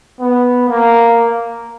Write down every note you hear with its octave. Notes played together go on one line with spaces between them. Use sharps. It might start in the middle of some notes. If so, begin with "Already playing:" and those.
B3
A#3